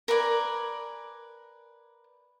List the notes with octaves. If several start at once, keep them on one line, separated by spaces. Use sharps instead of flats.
A#4 B4 D5 G#5